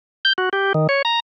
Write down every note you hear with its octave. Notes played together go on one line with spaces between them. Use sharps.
G6
F#4
G4
D#3
C#5
A#5